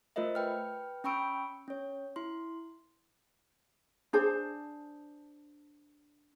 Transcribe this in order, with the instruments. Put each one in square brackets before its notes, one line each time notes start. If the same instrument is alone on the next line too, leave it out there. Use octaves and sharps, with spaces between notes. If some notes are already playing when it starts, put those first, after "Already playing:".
[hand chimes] A3 F4 A#4 C5 D#5 E5
B4 G5 F6
C#4 G5 B5 C#6 E6 D7
C#4 C#5
E4 C6
[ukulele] D4 G#4 C5 A5